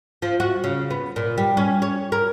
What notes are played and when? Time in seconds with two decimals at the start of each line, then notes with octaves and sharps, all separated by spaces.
0.22 F3
0.40 F#4
0.64 C#3
0.90 B3
1.16 A#2
1.38 G3
1.57 C#4
1.82 C#5
2.12 A#4